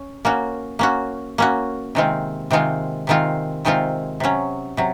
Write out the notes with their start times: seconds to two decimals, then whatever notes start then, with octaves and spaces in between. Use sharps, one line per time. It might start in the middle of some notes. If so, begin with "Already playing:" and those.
Already playing: C#4
0.25 A#3 C#4 F#4
0.79 A#3 C#4 F#4
1.38 A#3 C#4 F#4
1.95 C3 D#3 G#3 C4 F4
2.51 C3 D#3 G#3 C4 F4
3.07 C3 D#3 G#3 C4 F4
3.65 C3 D#3 G#3 C4 F4
4.20 C3 F#3 C#4
4.77 C3 F#3